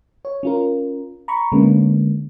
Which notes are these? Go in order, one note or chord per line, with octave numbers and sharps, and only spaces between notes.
C#5
C#4 F4 A#4
A#5 B5 C#6
D3 G#3 A#3 B3 C#4